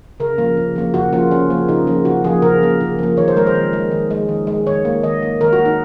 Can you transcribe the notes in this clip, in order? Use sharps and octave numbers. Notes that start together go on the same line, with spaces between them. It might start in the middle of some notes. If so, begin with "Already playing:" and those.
C#3 A#4
F3 A#3
C#3
F3 A#3
C#3 F#4
F3 A#3 F4
C#3 C#4
F3 A#3
C#3 D#4
F3 A#3
C#3 F#4
F3 A#3 G#4
C#3 A#4
F3 A#3
C#3
F3 A#3
D#3 C#5
C5
G#3 A#4
C5
D#3
G#3
D#3
G#3
D#3
G#3
D#3 C#5
A#3
D#3 D#5
A#3
D#3 A#4
F#4
A#3
D#4